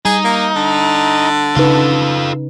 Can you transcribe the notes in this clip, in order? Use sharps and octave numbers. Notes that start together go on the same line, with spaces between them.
G3 D#4 G#4
A#3
D3
C#3 D#4 F4 A4 B4